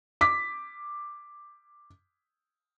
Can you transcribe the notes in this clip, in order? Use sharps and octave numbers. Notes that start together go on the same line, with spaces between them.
D6 B6